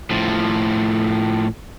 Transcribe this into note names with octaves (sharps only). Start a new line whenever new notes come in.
A2 F3